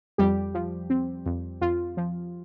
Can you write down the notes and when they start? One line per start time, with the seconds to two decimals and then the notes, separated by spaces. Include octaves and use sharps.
0.18 F2 G3 G4
0.54 F3
0.90 C4
1.26 F2
1.61 F2 F4
1.97 F3